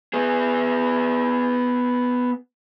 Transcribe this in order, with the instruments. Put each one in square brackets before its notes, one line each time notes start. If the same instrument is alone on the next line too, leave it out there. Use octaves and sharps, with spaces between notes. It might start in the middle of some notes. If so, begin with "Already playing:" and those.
[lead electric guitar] B3 G#4